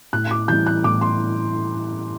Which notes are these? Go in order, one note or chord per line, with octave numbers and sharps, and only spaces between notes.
A2 F#6
D6
E3 G3 G6
F#6
A2 D6
C6